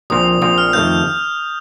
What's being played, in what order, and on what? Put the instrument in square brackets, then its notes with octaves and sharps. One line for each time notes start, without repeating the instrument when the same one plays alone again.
[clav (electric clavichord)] A#1 A#2 F3 C4 F4 [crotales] D#6
[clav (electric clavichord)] A#1 A#2 F3 C4 F4 [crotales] D#6
[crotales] F6
[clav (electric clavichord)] F2 D#3 A3 C4 [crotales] G6